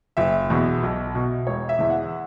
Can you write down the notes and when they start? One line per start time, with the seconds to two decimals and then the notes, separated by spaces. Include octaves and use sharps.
0.17 F#1 E5
0.50 E2 B2
0.83 B1
1.15 B2
1.47 E1 C#5
1.69 E5
1.79 E2 E3
1.90 F#5